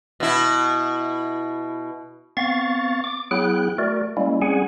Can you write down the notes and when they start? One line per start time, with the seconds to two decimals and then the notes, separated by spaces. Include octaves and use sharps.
0.20 B2 E4
2.37 B3 C4 F5 C#6 A6
3.04 D6
3.31 F#3 B3 E4 G#4 G5 F#6
3.78 A3 F#4 A#4 D5
4.17 G3 G#3 A#3 C#4 E4
4.42 G3 C4 C#4 G#4 F#5 G#5